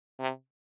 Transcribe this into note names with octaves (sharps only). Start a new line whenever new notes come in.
C3